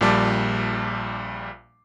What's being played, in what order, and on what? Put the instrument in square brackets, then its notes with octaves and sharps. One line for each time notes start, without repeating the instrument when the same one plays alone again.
[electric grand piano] A#1 A#2 G3 A5 D6